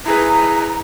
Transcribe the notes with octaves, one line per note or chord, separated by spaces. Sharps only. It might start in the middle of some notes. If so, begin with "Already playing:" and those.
E4 G#4 B4 A#5